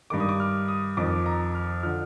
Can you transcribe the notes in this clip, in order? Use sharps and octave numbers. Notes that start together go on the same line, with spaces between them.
G2 D#3 D6
D#6
D6
F6
D#6
F2 D#3 D6
A#5
F6
D3 F3 F6